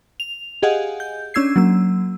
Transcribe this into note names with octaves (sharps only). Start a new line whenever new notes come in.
F7
G4 G#4 D#5 F5 F#5 G#5
G6
C#4 D4 E6 G#6 C7
F#3 A#3 E6